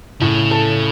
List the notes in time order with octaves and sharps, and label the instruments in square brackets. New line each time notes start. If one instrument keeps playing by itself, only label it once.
[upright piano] A2 [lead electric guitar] C#3
[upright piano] A4